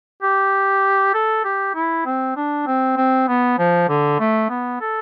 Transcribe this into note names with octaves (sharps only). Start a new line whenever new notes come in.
G4
A4
G4
E4
C4
D4
C4
C4
B3
F3
D3
A3
B3
A4